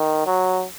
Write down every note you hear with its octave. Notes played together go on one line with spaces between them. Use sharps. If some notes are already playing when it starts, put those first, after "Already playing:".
Already playing: D#3
F#3